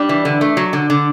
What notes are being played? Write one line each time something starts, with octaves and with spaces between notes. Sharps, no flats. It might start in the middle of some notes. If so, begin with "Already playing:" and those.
Already playing: G3 D4
E3
D3
A3
F#3
D3
D3